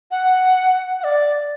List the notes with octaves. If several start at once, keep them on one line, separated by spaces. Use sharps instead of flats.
F#5
F#5
D5